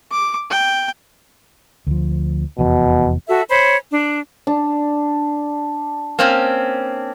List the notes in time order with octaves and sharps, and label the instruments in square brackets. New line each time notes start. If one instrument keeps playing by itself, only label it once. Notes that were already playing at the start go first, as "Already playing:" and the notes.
[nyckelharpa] D6
G5
[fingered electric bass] D2 F3
[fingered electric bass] F1 E2 [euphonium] B2
[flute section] F#4 A4 E5
C5 C#5 B5
D4
[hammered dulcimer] D4
[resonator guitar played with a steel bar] A#3 C4 C#4